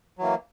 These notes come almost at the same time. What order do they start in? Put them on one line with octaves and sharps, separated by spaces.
F#3 E3 A#3